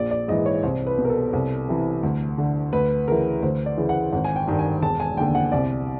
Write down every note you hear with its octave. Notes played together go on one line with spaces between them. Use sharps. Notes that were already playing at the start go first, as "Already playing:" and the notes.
Already playing: A#1 D5
D5
G#2 E3 D#5
C#5
C2 C5
B4
B2
A#4
A4
C2
C3 E3
D2
D3
D2 B4
C#3 E3 A#4
D2 C5
D5
C#3 E3
F#5
G#1 F#5
G#5
G5
G2 D#3
G#5
E1 A5
G#5
D#2 D3 G5
F#5
C2 D5